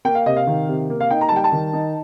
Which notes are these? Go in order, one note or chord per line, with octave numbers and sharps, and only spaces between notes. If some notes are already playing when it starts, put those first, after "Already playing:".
A#3 G5
F5
C3 D#5
F5
D#3
C3
A#3
F5
D#4 G5
A#5
A5
G3 G5
A5
D#3
D#4